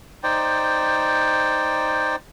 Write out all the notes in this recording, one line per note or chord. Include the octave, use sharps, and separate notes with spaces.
D#4 C5 D5 G5